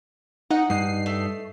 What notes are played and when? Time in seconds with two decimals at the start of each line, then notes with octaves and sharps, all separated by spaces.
0.51 D#4 F#5
0.70 G2 D#4 C7
1.06 A3